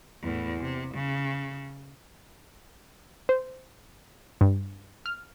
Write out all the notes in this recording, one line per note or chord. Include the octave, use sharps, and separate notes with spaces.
E2 A2
C3
C#3
C5
G2
F6